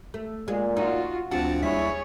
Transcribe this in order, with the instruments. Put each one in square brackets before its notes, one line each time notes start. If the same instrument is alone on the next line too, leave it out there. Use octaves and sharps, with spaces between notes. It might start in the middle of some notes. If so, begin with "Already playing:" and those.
[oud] A3
[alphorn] A#2 [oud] G#3
[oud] D#4 [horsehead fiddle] F4 F#4
[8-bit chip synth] D2 C4 F#5 [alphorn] F3 [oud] D4 F#4 [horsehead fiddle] A5
[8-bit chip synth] D#2 G3 B6 [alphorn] E4 [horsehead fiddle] G#4 C#5